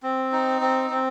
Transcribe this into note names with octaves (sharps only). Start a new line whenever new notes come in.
C4
D#4
C4
C4